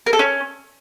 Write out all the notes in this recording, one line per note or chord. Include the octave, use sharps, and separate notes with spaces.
A#4
A4
C#4